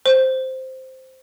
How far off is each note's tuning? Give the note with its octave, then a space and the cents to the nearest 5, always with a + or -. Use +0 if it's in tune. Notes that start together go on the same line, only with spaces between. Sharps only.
C5 -5